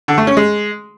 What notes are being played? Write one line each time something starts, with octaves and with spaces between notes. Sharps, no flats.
D3
A3
C#4
G#3